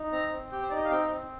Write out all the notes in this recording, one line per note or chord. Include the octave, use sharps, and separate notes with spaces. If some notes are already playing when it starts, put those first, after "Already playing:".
Already playing: D#4
C4 A#5
C4
G4 G5
C5
D#4 D5
D#5
F5
C4 G5
C4